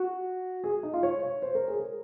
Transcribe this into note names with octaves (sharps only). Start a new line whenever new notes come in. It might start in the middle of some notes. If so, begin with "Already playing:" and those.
Already playing: F#4
G#4
D#4
F4
C#5
C#5
C5
A#4
G#4
A#4